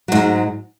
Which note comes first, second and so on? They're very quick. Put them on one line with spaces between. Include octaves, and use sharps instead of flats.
F#3 G#2 G#3